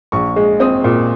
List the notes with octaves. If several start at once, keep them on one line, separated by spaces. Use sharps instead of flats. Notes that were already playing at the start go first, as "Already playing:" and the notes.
A#1 C#6
G#3
C4 D#6
A#2